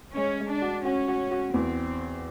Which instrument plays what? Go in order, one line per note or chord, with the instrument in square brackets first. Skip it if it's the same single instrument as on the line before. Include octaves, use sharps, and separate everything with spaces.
[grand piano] G#3 [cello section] C#4
[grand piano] G#3
[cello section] D4
[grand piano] F#4
[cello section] C#4 [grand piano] F#4
[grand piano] F#4
F#4
[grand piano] E2 [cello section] C4